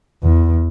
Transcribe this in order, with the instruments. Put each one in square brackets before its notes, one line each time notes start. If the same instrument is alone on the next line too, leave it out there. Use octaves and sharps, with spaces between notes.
[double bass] E2